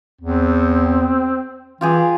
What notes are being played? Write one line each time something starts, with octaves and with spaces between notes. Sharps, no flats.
E2 C4
E3 F4 G4 G#4